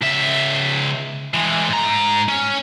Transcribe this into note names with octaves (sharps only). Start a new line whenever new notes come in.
C#2 E5
E3 G#3
G#2 A#5
C#4